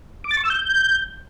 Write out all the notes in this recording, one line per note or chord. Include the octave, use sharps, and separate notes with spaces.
D6
A6
C#6
E6
G6